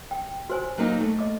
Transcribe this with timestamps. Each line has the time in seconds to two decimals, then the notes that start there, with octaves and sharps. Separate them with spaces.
0.11 G5
0.50 F#4 C5 G#5
0.78 F#3 A#3 D#4
1.01 A3
1.19 D#5 D6